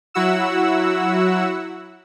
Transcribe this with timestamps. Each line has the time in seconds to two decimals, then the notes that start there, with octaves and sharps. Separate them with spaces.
0.14 F#3 E4 F#4 F#5 E6